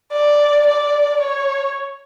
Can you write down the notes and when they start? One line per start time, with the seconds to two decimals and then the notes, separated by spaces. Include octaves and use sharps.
0.12 D5
0.67 D5
1.21 C#5